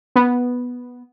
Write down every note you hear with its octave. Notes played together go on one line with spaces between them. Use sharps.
B3